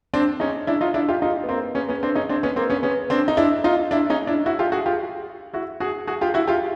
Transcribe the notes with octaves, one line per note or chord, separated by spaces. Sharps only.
C4 D4
C#4 D#4
D4 E4
D#4 F4
D4 E4
F4 G4
D#4 F4
B3
A#3 C4
B3 C#4
B3 C#4
C4 D4
C#4 D#4
C4 D4
B3 C#4
A#3 C4
B3 C#4
B3 C#4
C4 D4
D#4
D4 E4
D#4 F4
D4 E4
C#4 D#4
D4 E4
E4 F#4
F4 G4
F#4 G#4
F4 G4
E4 F#4
F#4 G#4
F#4 G#4
F4 G4
E4 F#4
F4 G4